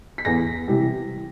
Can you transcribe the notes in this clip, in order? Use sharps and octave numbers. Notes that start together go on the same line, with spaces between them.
B6
E2 A#6
C3 E3 G3